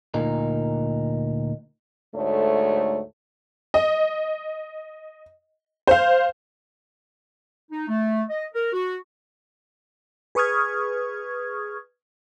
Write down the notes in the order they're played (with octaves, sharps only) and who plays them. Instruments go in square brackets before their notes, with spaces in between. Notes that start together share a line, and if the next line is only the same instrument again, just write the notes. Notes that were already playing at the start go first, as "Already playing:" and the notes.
[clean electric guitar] D2 A#2 D#4 A#4
[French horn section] D2 G#2 A3 C#5
[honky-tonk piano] D#5
C5 F5
[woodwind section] D#4
A3
D#5
A#4
F#4
[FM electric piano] G#4 B4 C#6 D#6 F6 G#6